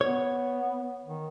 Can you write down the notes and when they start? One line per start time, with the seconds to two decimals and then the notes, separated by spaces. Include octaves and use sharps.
0.01 B3 C#5
1.05 D#3